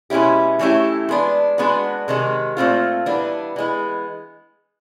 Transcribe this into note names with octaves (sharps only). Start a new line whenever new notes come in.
B2 G#3 C#4 E4 G4
E3 A3 C#4 E4 G4
G#3 B3 D4
G#3 B3 D4 F#4
C3 D#3 G#3
A#2 F#3 A3 C4 F4
E3 G3 B3 D4
E3 G#3 B3